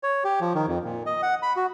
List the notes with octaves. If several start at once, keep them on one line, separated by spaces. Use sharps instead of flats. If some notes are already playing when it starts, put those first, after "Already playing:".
C#5
G4
F3
D#3
F2
A#2
D#5
F#5
B5
F#4